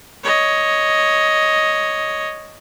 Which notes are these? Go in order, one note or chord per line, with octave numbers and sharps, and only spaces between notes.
C#5 D#5